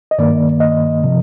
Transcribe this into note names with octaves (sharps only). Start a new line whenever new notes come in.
D#5
G2 D#3 A#3 D5
D#5
C3 F3